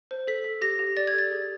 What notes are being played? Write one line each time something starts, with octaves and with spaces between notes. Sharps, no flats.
C5
A4 B6
A4
G4 A#6
G4
D5 A6
G#6
A4
A6
G#4